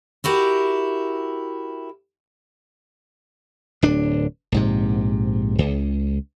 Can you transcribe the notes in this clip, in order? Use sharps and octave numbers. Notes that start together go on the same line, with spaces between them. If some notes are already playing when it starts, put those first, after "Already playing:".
E4 F#4 G4 A#4
D1 D4
A#1 G#2 C3
C#2